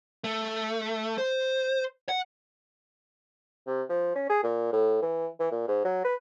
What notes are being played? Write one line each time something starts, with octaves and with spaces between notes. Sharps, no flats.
A3
C5
F#5
C3
F3
C#4
G#4
A#2
A2
E3
E3
A#2
G#2
F#3
B4